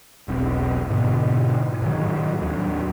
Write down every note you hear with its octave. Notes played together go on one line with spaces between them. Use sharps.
E1 B1 C4
G#2 B2 D3 B3
A2 D#3 F#3
D#2 F#3